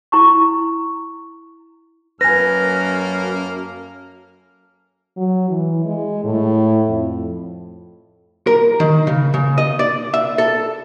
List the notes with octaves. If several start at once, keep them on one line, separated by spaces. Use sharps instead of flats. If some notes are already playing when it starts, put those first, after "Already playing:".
E4 A#5 C#6
F#2 A#3 A4 B4 G#5 F6 A#6
F#3
E3
G#3
A2
F2
A#4
D#3
C#3
C#3
D#5
D5
E5
A4